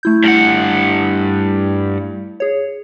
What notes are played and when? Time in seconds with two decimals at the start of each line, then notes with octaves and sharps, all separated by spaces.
0.03 A3 E4 G6
0.24 G2 F#5
2.40 G#4 C#5